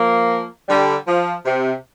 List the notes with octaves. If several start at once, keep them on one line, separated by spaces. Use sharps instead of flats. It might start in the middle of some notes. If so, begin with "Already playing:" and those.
Already playing: F3 A#3
D3 G3
F3
C3